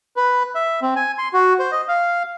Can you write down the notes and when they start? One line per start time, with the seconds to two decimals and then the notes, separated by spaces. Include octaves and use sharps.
0.16 B4
0.55 E5
0.82 C4
0.96 G#5
1.18 C6
1.33 F#4
1.59 C5
1.72 D#5
1.88 F5